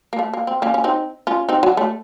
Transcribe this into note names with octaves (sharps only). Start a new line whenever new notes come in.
A#3
A3
A#3
C4
A#3 C#4
C#4
C4 D#4
C#4 F4
C4 D#4
F#3
A3